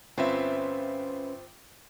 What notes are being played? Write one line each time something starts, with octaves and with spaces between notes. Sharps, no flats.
G1 C4 C#4 F4 B4 C5 E5